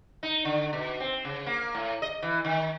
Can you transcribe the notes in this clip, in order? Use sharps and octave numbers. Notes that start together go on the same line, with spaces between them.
D#4
D3
B2
C4
C#3
A#3
A2
D#5
E3
D#3